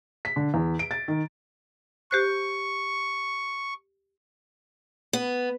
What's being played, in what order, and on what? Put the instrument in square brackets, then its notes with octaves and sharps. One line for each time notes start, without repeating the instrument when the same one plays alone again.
[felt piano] B6
D3
E2
D7
A6
D#3
[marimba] G4 C5 F#6 [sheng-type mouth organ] C#6
[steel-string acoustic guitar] B3